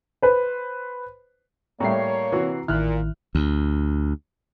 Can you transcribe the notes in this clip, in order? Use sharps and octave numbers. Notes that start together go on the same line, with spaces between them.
B4 C5
A2 G3 A#3 C#5 E5 A#5 C7
C3 E3 F#4
A1 A#2 D#3 E4 F6 F#6
D2